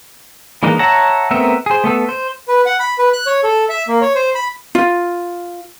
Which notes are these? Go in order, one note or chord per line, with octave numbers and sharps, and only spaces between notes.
E3 G#3 A#3 D4 D#4
C#5 E5 F#5 A5 A#5
A3 B3 C4 A#4 E5
G#4 C5
A3 B3 A4
C5
B4
F#5
B5
B4
F#6
C#5
A4
E5
A#3
C#5
C5
B5
F4